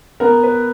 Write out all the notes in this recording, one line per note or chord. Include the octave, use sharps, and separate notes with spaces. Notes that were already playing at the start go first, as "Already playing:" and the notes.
B3 A#4
B4